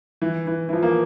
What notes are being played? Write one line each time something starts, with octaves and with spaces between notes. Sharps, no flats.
E3
E3
E3
F3
A#3